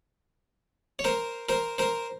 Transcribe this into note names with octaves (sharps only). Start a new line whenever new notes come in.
C#5
A#4 C5
A#4 C5
A#4 C5